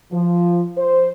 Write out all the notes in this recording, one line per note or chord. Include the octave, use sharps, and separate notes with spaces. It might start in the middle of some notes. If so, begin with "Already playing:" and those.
F3
C5